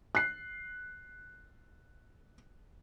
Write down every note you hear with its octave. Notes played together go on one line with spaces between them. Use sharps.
F#6 C7